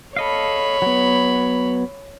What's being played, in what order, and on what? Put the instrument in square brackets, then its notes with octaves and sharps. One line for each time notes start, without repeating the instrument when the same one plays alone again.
[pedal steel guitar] A4 D#5 F5 [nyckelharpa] C#5 B5
[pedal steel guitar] F#3 B3